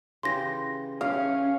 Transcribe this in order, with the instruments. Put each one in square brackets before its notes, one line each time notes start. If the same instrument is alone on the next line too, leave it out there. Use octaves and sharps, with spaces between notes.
[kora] C#3 E3 G4 [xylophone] C6 A#6
[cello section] C#4 [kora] G4 [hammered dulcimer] F5